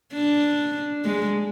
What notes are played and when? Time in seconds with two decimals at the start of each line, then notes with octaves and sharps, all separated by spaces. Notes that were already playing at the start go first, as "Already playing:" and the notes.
0.13 D4
1.04 G#3